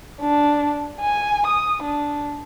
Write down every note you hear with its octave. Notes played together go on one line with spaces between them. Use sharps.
D4
G#5
D#6
D4